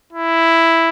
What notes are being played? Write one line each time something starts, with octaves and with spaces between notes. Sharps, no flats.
E4